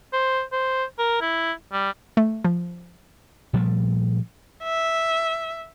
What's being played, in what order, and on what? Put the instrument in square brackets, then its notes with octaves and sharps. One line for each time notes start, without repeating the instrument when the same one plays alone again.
[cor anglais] C5
C5
A#4
E4
G3
[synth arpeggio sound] A3
F3
[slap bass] A#2 F3 G3 A3
[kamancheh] E5